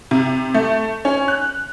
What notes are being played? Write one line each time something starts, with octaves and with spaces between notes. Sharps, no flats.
C3
A3
C#4
F#6